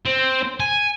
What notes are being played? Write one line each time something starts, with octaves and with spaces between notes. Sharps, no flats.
C4
G#5